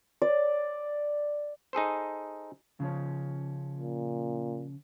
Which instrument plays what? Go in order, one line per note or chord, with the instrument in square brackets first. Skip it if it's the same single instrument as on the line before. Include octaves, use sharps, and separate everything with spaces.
[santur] D5
[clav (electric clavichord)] D#4 G#4 A4 C5
[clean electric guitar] C#3 F3 C#4
[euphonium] A#2